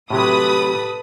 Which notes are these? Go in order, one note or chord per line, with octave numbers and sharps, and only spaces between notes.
A2 C3 F#3 G4 A4 B4 B5 D#6